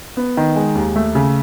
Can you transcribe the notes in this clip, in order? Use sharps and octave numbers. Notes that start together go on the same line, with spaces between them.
B3
D#3
G#3
D#2
A3
C#3